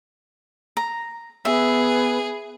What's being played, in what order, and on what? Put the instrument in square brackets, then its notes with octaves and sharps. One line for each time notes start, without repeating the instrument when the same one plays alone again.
[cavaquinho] A#5
[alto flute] B3 [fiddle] G#4 [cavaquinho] E5